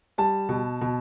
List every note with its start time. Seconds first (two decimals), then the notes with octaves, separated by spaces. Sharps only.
0.18 G3 A5
0.49 B2
0.81 B2